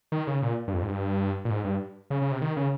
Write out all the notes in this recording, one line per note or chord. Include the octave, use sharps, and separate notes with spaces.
D#3
C#3
A#2
G2
F2
G#2
G2
A#2
G#2
G2
C#3
C#3
C3
D#3
C#3